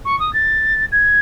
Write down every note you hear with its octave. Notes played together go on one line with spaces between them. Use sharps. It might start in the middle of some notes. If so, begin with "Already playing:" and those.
C#6
D#6
A6
G#6